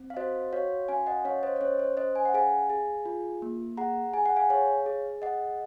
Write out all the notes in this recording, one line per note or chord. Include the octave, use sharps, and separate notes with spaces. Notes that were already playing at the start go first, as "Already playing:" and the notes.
Already playing: C4
F5
F#4 C5 D#5
F#4 C#5 F5
C#4 F5 G#5
D#5 F#5
C#4 C#5 F5
C5 D#5
C#5
C#4 C5
C5
C#4 C5 D#5
G#5
F#5
G#4 F5 G#5
G#4
F4
A#3
G#4 F#5 A#5
G#4 G#5
F#5
F5 G#5
G#4 C#5 F5
G#4
G#4 D#5 F#5